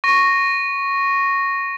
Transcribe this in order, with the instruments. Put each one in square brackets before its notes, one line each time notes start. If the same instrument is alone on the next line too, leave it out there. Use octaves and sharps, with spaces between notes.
[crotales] C#6 A#6